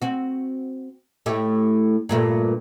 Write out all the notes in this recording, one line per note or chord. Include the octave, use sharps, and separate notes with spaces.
C4 F#4
A2 A3 G4
G2 A#2 A3